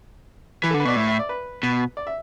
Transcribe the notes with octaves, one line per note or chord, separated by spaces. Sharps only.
E3 B4
A4
D3
B4
B2 D5
A2 E5
E5
D5
B4
B2
D5
E5